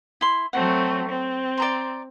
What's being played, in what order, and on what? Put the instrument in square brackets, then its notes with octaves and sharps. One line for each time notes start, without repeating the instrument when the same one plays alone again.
[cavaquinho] E4 C6
[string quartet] F#3 A3 C4 [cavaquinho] F#5
[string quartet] C4
[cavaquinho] D5 A#5 C6